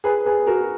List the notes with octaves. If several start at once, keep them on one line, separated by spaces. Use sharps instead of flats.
G#4 B4
G#4 B4
F#4 A#4